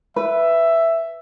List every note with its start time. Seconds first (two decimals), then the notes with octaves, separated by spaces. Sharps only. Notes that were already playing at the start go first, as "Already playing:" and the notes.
0.16 B4 E5